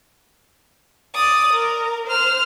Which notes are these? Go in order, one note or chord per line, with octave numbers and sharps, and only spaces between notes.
D5 D#6
A#4
C5 F6